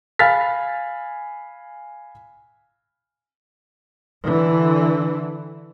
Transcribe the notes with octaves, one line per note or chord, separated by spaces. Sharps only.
F5 G#5 B5 F6 A6 B6
D3 E3